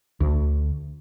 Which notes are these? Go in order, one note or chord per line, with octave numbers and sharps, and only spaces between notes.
D2